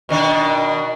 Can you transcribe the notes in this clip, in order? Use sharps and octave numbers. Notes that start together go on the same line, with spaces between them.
B2 D#3 D4